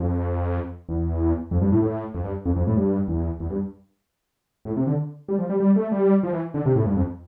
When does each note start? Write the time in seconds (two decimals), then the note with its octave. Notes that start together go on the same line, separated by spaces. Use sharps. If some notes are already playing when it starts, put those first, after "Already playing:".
Already playing: F2
0.89 E2
1.51 F2
1.62 G2
1.72 A2
1.82 A2
2.14 F2
2.24 G2
2.46 F2
2.56 F2
2.67 A2
2.77 G2
3.08 E2
3.40 E2
3.50 G2
4.65 A2
4.76 C3
4.87 D3
5.28 G3
5.39 F3
5.50 G3
5.60 G3
5.76 A3
5.92 G3
6.23 F3
6.33 E3
6.54 D3
6.66 C3
6.75 A2
6.86 G2
6.97 F2